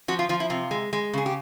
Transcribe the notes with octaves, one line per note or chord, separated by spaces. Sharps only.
F3 F#4
F4
F3 F4
E4
C3 F4
G#3
G#3
C#3 G#4
G4